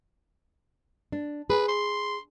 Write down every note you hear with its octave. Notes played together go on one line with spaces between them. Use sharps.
D4
G#4 B4
C6